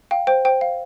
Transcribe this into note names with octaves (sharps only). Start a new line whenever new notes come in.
F5 G5
C5 G5
C5 G5
F5